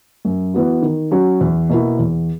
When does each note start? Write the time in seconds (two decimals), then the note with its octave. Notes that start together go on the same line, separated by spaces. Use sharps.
0.25 F#2
0.54 E3 B3 F#4
0.82 D#3
1.11 F#3 C#4 F#4
1.41 E2
1.69 B2 A#3 E4
1.99 E2